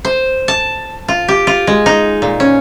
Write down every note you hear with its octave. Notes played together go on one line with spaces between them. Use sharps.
C5
A5
F4
G4
F4
G#3
D#4
A#2
C#4